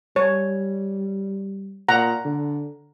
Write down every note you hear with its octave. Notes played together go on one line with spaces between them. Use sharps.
G3 C#5
A#2 F#5 A#5
D3